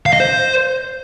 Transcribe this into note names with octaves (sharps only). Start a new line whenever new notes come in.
F5
D#5
C5